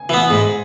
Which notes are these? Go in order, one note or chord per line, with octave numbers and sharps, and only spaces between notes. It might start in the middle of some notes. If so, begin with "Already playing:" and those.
Already playing: G#5
E3 B3
G#2